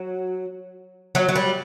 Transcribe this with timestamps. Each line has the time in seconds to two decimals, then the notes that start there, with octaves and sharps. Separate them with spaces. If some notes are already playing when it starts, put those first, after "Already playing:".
Already playing: F#3
1.15 F#3
1.29 F#3
1.35 G3